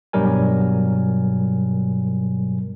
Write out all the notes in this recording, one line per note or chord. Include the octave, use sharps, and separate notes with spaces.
G2 B2 F#3 G3 A#4 G#5